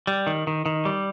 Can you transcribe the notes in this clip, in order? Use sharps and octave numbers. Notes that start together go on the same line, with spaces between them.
G3
D#3
D#3
D#3
G3